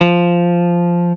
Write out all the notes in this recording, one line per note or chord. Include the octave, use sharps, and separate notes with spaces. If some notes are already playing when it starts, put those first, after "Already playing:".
F3